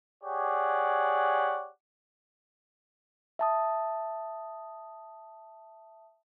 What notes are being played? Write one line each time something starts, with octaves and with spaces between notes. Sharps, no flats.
G4 G#4 C#5 D5 F#5
E5 A5 D#6